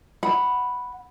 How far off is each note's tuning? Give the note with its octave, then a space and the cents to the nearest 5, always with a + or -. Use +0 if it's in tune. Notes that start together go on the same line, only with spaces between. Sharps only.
F#5 +0 B5 +0